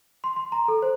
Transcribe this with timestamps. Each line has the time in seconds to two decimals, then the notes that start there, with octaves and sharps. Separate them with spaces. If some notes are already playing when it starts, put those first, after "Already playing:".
0.24 C6
0.36 C6
0.52 A#5
0.68 A4
0.82 C5